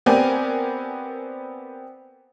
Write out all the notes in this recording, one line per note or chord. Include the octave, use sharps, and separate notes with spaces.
B3 C4 G4 A#4 D5 G#5